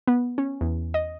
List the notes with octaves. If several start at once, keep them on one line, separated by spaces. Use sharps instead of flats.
B3
C#4
E2
D#5